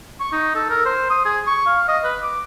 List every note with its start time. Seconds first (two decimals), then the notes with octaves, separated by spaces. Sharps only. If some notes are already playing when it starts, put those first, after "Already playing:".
0.20 C#6
0.32 D#4
0.55 A4
0.69 A#4
0.85 C5
1.10 D#6
1.25 G#4
1.47 C#6
1.66 F5
1.88 D#5
2.04 B4
2.22 D6